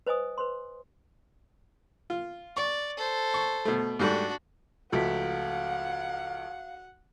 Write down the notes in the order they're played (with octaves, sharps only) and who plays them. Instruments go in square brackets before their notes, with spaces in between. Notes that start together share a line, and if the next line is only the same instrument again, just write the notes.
[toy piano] B4 C5 D#5 G#5 D#6
B4 C5 C6
[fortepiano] F4
[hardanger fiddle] D5 [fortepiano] C#6
[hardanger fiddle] A4 C5
[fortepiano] C#6
B2 A3
[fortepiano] G#2 G3 A3 [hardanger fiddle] D4 F#4
[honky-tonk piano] C#2 F3 A3 [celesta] F#4 B6 [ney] F5 [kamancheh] F#5